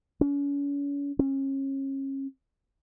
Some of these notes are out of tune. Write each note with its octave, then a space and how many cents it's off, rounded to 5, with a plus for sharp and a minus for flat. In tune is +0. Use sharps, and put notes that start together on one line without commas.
C#4 +40
C#4 -35